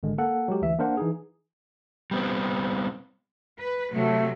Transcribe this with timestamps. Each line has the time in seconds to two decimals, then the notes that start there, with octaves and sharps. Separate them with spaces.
0.03 G#1 D3 G#3
0.18 A#3 A4 F#5
0.48 F#3 G#3 G4
0.62 D2 E3 E5
0.79 A#3 D4 A#4 C5 F#5
0.97 E3 D#4 G#4
2.11 G3 B3 C4
3.60 B4
3.92 C3 F#3 A3